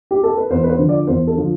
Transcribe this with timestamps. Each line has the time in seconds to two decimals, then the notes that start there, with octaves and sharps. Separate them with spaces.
0.11 G4
0.23 A4
0.37 B4
0.50 E2 C5
0.63 B4
0.69 C5
0.78 D3 F3
0.89 D5
1.07 E2 C5
1.27 A4
1.36 D3 F3